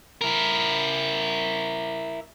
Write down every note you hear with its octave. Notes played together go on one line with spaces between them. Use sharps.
E4 A#4